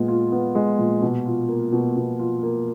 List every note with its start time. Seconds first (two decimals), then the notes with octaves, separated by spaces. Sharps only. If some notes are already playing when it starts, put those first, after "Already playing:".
Already playing: A#2 G#3 B3
0.08 F4
0.32 B3
0.55 G#3
0.79 A#2
1.02 B2
1.26 F4
1.49 A#3
1.72 B2
1.96 B2
2.19 F4
2.43 A#3